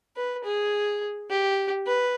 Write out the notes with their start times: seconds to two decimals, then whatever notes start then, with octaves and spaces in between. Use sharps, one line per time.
0.16 B4
0.44 G#4
1.30 G4
1.86 B4